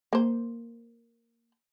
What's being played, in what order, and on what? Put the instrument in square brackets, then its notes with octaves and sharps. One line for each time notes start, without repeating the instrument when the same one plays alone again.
[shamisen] A#3 C5